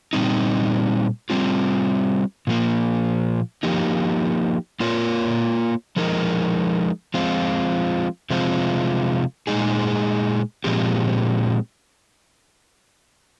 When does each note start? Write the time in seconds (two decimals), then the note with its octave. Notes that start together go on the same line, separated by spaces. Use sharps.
0.13 A#2 G3 C4 D#4
1.30 G3 C4 F4
2.47 A#2 F3 A#3
3.63 F3 A#3 D#4 G4
4.80 A#3 F4 A#4 C#5
5.96 F3 G#3 D#4 A#4
7.14 F3 G#3 C4 F4
8.30 C3 F3 G#3 C4 F4
9.47 A#2 G#3 D#4 G#4
10.64 A#2 F3 G#3 C4 G4